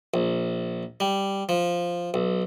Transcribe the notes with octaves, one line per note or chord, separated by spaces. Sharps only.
A#1
G3
F3
B1